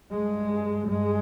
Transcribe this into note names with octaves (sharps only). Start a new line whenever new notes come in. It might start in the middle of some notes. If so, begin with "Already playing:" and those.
G2 G#3
G2 G#3